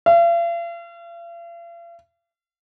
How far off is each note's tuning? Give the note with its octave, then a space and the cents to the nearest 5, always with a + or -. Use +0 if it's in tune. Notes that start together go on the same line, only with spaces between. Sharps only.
F5 -45